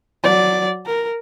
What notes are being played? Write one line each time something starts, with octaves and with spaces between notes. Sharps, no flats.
F#3 D5
A#4